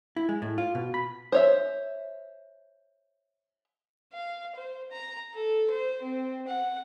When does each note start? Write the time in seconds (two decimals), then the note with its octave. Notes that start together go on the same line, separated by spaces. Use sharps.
0.16 E4
0.29 G#3
0.42 A2
0.58 F4
0.75 B2
0.94 B5
1.32 C5 C#5 E5
4.14 F5
4.55 C5
4.91 A#5
5.34 A4
5.71 C5
6.02 C4
6.48 F#5